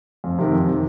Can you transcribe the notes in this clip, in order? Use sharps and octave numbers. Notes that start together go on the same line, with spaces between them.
F2
C3 D#3
F2
C3 D#3